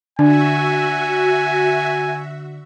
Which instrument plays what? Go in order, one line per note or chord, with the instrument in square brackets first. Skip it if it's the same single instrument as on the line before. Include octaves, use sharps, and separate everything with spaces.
[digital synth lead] D3 [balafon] D4 [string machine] F#4 E5 [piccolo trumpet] G#5